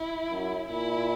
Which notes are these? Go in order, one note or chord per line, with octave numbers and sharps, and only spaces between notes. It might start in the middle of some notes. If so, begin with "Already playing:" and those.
Already playing: E4
F#2
A#2 E4